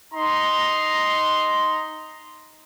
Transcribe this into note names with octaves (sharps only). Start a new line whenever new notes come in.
D#4 A#5 C6